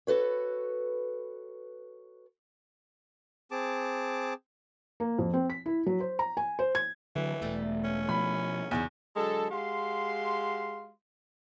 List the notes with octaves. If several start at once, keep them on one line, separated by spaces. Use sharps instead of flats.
F#4 A4 B4 C#5
C4 G#4 A5 D6
A#3
F2
C4
B6
E4
F#3
C5
A#5
G#5
C5
G#6
D3 E3 F#3
E1 G3 A3
C#4
B2 F3 B5
E2 C#3 F#3 D#4
D3 F#3 G#3 A4
G#3 F#4 G4 F5 C6